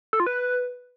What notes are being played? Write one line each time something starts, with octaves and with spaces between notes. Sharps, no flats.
A4
F4
B4